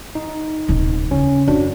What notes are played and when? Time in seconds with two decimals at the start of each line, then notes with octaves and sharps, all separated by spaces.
0.15 D#4
0.68 D#1 C3
1.11 C#3 C#4
1.48 F#2 D4 F#4